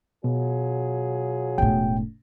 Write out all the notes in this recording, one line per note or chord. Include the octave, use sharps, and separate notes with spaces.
B2 F#3 F4 G#4
E1 A2 G5